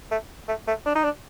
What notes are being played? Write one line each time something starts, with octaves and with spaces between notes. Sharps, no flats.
A3
A3
A3
D4
D#4
D4